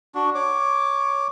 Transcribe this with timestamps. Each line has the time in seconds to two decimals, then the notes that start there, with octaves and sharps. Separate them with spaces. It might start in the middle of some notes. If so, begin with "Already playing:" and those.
0.15 D4 F#4
0.35 C#5 D6